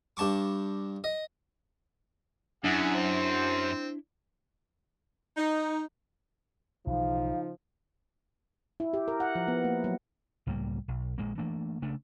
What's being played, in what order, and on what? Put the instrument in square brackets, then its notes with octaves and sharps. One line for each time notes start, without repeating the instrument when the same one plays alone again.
[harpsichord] G2 D4 A5 C#6 D6
D#5
[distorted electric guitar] F#2 [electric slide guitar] D4 E4 [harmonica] G#4 E5 F#5
[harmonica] C4 [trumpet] C5
[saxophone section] D#4
[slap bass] B1 E3 [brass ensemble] C#3 F3 D#4 [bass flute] F5
[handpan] E4
G4
A#4
F#5
F3
B3
A#3
F#3
[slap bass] C#2 A2 G3 A#3
B1
A#1 A#2 G#3 A#3
E3 A3 A#3 D4
C#3 A3 D4